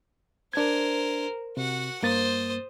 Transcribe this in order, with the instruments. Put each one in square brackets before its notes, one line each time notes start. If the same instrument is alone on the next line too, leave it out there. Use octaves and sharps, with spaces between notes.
[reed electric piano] D4 G#6 [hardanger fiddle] A#4 C5
[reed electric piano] C3 [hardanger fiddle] F#4 F#5
[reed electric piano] G2 A#3 A6 [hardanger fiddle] C5 D#6